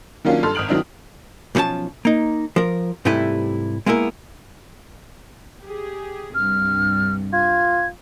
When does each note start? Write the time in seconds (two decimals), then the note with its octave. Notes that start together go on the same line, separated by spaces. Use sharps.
0.25 D#3 F#3 A#3 C#4 D4 F4
0.43 G2 A4 C6 F6
0.55 G#1 D#6 F6 D7 F#7
0.69 D#3 F#3 C4 D4 E4
1.55 B1 A2 F3 C#4 A5
2.05 A#3 D#4
2.56 F3 A#4
3.05 G#2 C3 G3 A3 E4 B4
3.86 G#3 A#3 B3 E4 A#4
5.63 G4 G#4
6.35 C2 G2 F6
7.33 F4 G#6